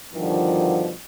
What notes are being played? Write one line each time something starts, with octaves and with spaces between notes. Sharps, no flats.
G2 B2 D3 D#3 F3